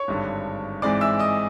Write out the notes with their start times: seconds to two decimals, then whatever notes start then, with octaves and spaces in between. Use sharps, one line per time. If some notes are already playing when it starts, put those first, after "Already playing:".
Already playing: C#5 C#6
0.08 G#1 G2 D3
0.82 G#2 E3 G#3 C4 D5 D6
1.01 E5 E6
1.19 D#5 D#6